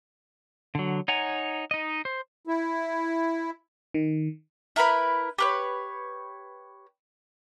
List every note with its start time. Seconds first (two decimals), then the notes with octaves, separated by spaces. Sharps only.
0.75 D3 F#3
1.08 D#4 C#5 F#5 G#5 A#5
1.71 D#4 D#5
2.05 C5
2.47 E4
3.94 D#3
4.76 E4 A#4 B4 B5
5.38 G4 B4 C#5